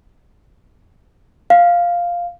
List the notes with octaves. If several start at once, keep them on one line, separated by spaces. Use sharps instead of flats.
F5